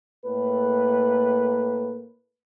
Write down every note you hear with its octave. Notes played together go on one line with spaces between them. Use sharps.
A2 A#3 A4 B4